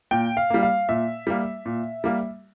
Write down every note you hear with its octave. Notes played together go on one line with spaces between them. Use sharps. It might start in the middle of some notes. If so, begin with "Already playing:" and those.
A#2 G5
F5
G3 A#3
F5
A#2 E5
G3 A#3
A#2
G3 A#3